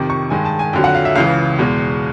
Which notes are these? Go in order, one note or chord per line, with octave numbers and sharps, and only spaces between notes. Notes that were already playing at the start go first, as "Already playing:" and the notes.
Already playing: F2 C3 D#3 D6
C#6
G2 D#3 G#3 G#5
A5
G#5
F2 D3 F#3 G5
F#5
F5
E5
C#2 C#3 E3 F5
E2 B2 G#3